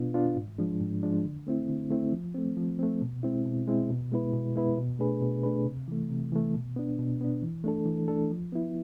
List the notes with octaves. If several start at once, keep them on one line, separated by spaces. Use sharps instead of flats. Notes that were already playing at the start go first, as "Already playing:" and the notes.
Already playing: B2 B3 D4 F4
B3 D4 F4
G#2
F3 G#3 D4
G#2
F3 G#3 D4
D3
A3 C4 E4
D3
A3 C4 E4
F3
A3 C4
F3
A3 C4
B2
G#3 C4 E4
B2
G#3 C4 E4
B2
G#3 B3 E4 B4
B2
G#3 B3 E4 B4
B2
A3 D4 G#4 B4
B2
A3 D4 G#4 B4
C3
E3 A3
C3
E3 A3
B2
B3 D4
B2
B3 D4
E3
A3 D4 A4
E3
A3 D4 A4
F3
B3 E4